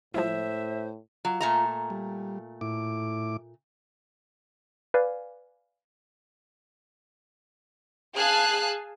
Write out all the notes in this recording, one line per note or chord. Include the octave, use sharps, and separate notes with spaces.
A2 F3 G#3 E4 C5 E5
F#3 F4
A#2 A3 A#5
G3
A2 E4 D6
B4 D5 F5 G#5
G#4 F5 G#5 A5 F#6